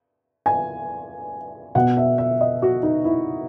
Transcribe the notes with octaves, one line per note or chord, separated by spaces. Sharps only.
G#5
B2 F#5
E5
E5
D#5
F#4
D#4
E4